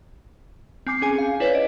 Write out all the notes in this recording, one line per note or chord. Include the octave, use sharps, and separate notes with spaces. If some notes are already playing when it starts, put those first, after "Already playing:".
C4 G#5 D6 C7
C#4 G#4 G#5
F5
E4 B4 C#5 D5
D#5 D7